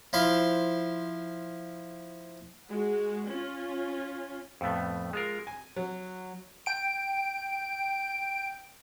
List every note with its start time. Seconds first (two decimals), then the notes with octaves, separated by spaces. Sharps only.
0.13 F3 E4 C5 F5
2.70 G#3 F#4
3.29 C#4 F4
4.61 F2 A2 A3 B3
5.13 G#3 F4 A#4
5.47 G#5
5.76 F#3
6.66 G5 D7